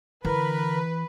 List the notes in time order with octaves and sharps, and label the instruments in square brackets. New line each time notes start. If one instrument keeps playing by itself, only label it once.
[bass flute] D3 [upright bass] E3 [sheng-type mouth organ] A#4 [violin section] B4